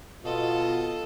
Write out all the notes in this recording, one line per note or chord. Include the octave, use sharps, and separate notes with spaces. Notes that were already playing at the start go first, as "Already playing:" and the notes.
B2 F4 A4 D#5